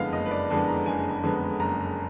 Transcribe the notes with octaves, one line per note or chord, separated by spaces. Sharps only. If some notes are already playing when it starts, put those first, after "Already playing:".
Already playing: F#1 F2 D3 G#3 B3 F5 F#5
F#1 D#5
B4
D5
F2 D3 G#3 B3
A#5
F#1 G#5
F2 D3 G#3 B3
F#1 A#5